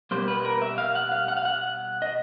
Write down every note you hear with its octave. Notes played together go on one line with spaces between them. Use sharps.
B2 G3 A#3 C5
B4
A#4
E5
F5
F#5
F5
F#5
F5
F#5
D#5